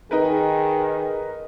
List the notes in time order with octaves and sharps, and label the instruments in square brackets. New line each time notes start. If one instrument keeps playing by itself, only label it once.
[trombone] D#3 [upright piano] D#4 A#4 B4 [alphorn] G#4